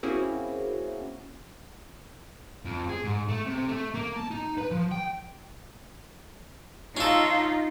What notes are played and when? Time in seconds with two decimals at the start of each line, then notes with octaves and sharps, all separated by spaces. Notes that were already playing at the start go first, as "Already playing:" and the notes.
0.03 A#3 C4 C#4 E4 F#4 G#4
2.65 F2
2.89 G#4
3.04 G#2
3.28 A3
3.46 C3
3.68 A3
3.94 A#3
4.16 A5
4.31 D#4
4.58 B4
4.71 F3
4.91 G5
6.97 C#4 D#4 F4 A4